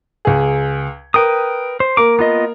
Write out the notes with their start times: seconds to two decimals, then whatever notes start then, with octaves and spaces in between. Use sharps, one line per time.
0.25 C#2 G#4
1.14 A#4 B4 G5 D#6
1.80 C5
1.97 A#3 A#4 D6
2.19 B3 F4 D#5